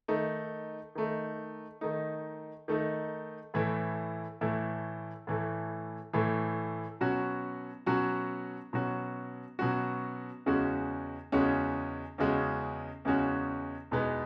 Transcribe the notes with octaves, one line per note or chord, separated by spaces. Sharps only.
D#3 A3 D#4
D#3 A3 D#4
D#3 A3 D#4
D#3 A3 D#4
A2 E3 A3 E4
A2 E3 A3 E4
A2 E3 A3 E4
A2 E3 A3 E4
B2 F#3 C#4 F#4
B2 F#3 C#4 F#4
B2 F#3 C#4 F#4
B2 F#3 C#4 F#4
E2 C#3 G#3 C#4 F#4
E2 C#3 G#3 C#4 F#4
E2 C#3 G#3 C#4 F#4
E2 C#3 G#3 C#4 F#4
E2 B2 G#3 B3 D#4